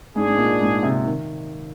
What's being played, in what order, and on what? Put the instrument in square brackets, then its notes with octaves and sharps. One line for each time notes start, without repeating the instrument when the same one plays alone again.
[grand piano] G#2 [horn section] G#3 D4 G#4
[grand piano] G#2
A#2
G#2
C3
D#3